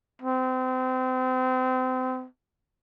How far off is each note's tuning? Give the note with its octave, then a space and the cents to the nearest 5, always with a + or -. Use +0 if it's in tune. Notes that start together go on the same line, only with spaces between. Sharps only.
C4 -30